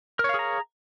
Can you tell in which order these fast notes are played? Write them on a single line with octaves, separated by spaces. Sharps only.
A#4 C#5 F5 G#4 A#5